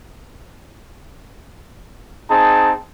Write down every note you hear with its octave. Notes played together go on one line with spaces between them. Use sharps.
C4 D#4 G#4 A5